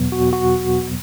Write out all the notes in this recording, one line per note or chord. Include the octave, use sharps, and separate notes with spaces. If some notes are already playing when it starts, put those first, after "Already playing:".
Already playing: E2 B2 F#3 B3
F#4
F#4